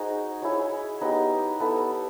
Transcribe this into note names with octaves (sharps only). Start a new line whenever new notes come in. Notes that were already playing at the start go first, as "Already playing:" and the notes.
Already playing: D#4 F#4 G#4 C5
E4 G#4 C#5
B3 D#4 G4
B3 E4 A4